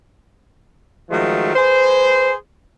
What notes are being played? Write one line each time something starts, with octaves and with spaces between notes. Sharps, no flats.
D#3 F3 F#3 G#3 A3
G#4 B4 C5